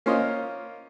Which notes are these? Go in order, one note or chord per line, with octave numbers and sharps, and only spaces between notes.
A#3 C#4 F4 C5 D#5